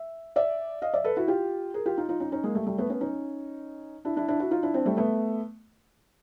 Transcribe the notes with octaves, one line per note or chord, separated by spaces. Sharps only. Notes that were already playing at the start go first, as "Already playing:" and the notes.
Already playing: E5
D5 E5
D#5 F5
D5 E5
A4 B4
E4 F#4
F4 G4
G#4 A#4
F4 G4
D#4 F4
D#4 F4
C#4 D#4
C#4 D#4
G#3 A#3
G3 A3
G3 A3
A3 B3
B3 C#4
C#4 D#4
D4 E4
D4 E4
D4 E4
E4 F#4
D#4 F4
D4 E4
C4 D4
G3 A3
A3 B3